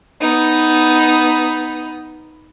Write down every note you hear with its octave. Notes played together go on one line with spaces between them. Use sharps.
B3 D#4